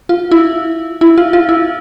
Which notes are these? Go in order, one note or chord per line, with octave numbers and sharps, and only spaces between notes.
F4
E4
E4
F4
F4
E4